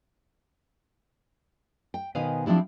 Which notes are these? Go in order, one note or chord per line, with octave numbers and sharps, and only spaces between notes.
G5
B2 D#3 B4 C5 F5 G#5
F3 C4 D4 E4 G4